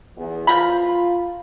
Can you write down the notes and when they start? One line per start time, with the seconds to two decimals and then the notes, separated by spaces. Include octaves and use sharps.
0.17 E2
0.47 F3 F4 A#4 B5